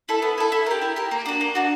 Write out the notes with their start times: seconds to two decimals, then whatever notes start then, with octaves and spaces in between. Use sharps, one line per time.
0.09 E4 A4
0.22 B3
0.38 E4 A4
0.52 E4
0.66 G4 A#4
0.82 E4
0.96 G4 A#4
1.11 A#3
1.26 D4 F#4
1.41 A#3
1.55 D4 F#4